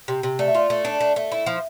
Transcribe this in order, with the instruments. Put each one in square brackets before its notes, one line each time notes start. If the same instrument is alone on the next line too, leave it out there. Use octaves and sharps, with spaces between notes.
[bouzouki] C3
C3
[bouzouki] A3 [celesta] D5
[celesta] E5
[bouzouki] F4 [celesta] D5
[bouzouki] A3
D4
A3
A3
[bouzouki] E4 [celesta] E5
[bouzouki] F3